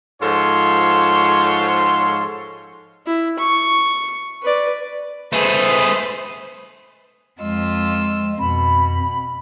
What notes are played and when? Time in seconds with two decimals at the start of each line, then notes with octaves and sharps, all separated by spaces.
0.22 G#2 F3 F4 A4 C#5 C6
3.06 E4
3.39 C#6
4.42 B4 D5
5.33 A3 G#4 B4 C5
7.40 F2 G#3 F4 E6
8.39 F2 B2 B5